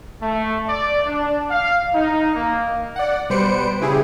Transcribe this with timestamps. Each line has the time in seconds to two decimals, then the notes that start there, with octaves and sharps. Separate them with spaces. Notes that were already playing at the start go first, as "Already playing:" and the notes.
0.21 A3
0.68 D5
1.06 D4
1.50 F5
1.94 D#4
2.34 A#3
2.96 D5 F#5
3.30 B2 G3 B4 C5 C#7 D7
3.81 C#3 E4 G4 G#4